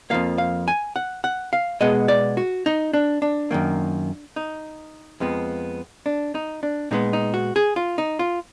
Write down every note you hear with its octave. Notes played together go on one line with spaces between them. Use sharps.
F2 F3 A#3 F5
F5
G#5
F#5
F#5
F5
B2 G#3 B3 D#5
D5
F#4
D#4
D4
D4
F#2 D#3 A#3
D#4
F2 F3 G#3 B3
D4
D#4
D4
A#2 G#3 B3 D#4
D#4
F#4
G#4
F4
D#4
F4